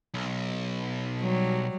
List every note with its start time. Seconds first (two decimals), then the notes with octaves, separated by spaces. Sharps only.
0.14 B1
1.21 F#3 G3